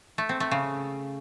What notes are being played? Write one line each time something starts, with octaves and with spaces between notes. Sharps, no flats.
A3
C4
A3
C#3